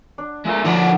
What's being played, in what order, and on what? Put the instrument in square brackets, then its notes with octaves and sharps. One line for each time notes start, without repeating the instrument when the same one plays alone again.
[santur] D4
[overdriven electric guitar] G#3 E5 [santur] F4 A4 A#4
[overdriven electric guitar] D3 F3 [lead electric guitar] D#4 D5 [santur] F#5